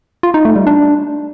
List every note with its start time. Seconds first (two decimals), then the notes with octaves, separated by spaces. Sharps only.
0.23 F4
0.34 D#4
0.45 A3
0.56 G3
0.67 D4